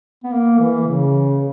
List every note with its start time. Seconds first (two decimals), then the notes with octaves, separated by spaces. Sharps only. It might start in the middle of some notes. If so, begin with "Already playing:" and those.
0.24 B3
0.33 A#3
0.60 E3
0.87 C#3